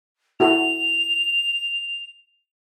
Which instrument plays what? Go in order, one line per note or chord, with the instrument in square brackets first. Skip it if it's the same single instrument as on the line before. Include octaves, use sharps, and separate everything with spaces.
[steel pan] E4 F#4 A4 [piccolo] F7